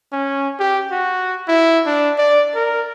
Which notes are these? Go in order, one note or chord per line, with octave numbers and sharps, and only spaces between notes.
C#4
G4
F#4
E4
D4
D5
A#4